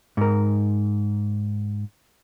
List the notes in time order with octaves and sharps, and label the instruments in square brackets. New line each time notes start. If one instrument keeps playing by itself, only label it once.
[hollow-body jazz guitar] G#2 A#4